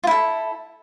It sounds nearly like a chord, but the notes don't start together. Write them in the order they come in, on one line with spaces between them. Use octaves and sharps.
F4 E4 A4